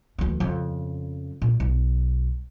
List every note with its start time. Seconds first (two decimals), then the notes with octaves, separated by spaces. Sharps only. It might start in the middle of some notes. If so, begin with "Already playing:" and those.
0.18 D2 E3
0.40 F2 C#3
1.42 A#2
1.60 B1